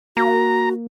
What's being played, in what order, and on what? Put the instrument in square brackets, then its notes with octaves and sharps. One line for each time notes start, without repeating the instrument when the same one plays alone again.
[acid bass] A#3 [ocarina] F#4 [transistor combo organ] A#5